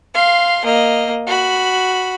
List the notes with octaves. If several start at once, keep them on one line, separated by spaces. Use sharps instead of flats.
F5 C6
A#3 D#5
F#4 B5